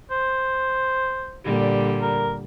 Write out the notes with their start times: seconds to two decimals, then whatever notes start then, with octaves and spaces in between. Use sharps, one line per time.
0.11 C5
1.45 A#2 D3 G3
2.02 A#4